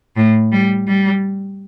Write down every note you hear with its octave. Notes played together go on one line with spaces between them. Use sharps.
A2
G3
G3